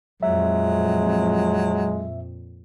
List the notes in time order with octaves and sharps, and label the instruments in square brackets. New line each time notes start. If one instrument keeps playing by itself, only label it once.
[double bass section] F2 A#2 [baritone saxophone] F#3 [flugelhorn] G#3 [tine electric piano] E5